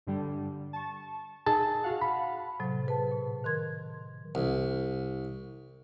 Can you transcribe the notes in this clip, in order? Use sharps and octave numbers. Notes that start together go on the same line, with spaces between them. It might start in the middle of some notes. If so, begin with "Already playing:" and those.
G2 D3 G3
A5 C#6
D#4 G#4 A5
F#4 F5 F#5
B5
A2 C3 F#3
G#4 B4 A5
A#2
D#3 A#4 C6 G#6
C2